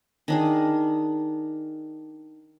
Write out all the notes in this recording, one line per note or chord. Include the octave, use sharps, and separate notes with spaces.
D#3 D4 G#4